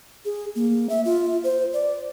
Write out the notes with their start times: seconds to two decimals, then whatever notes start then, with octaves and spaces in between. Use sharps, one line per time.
0.25 G#4
0.55 A#3
0.89 E5
1.05 F4
1.44 C5
1.73 D5